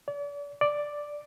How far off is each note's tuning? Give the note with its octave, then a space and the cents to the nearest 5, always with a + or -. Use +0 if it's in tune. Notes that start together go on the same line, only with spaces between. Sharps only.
D5 -40
D5 +0